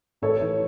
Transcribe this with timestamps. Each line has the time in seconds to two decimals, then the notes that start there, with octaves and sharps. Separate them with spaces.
0.22 A1 A4 C#5
0.41 E3